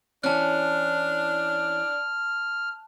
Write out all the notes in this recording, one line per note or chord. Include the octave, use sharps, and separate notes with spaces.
E3 C#4 D4 A5 F6 F#6